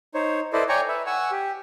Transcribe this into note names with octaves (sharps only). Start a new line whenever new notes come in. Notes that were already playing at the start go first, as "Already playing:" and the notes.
D#4 C5 C#5
E4 A4 B4 C5 D5 D#5
C#5 D5 G5 G#5 A#5 C#6
B4 E5
F#5 G#5 C#6 E6
G4